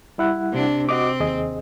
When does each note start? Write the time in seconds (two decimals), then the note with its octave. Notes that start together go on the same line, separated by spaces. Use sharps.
0.18 G3 E4 F#5
0.53 C3 D4
0.89 C4 F#4 D#5 D6
1.20 D#2 G#4 D#5